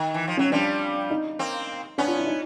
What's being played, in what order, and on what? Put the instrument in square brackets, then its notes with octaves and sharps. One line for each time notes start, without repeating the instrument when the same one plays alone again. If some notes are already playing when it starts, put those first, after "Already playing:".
Already playing: [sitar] D#3
E3
F3
[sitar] F#3 [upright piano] C#4
[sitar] F3 G3 [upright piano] D4
[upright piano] D#4
[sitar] A#3 C4
[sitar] B3 C#4 [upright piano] D4
[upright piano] F4
E4
D#4